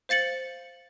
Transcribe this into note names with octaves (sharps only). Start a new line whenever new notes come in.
C5 F5 A6 C#7 F#7